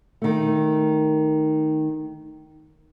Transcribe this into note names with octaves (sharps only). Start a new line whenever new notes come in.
D#3 A3